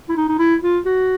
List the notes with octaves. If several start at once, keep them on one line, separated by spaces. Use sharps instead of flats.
E4
D#4
D#4
E4
F4
F#4